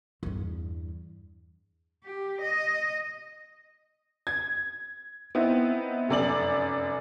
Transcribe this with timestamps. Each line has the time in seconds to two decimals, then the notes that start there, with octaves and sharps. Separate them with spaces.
0.23 E2 G2
2.04 G4
2.42 D#5
4.27 G#6
5.35 B3 C4 D#4 E4
6.09 F1 F#2 D5 F#7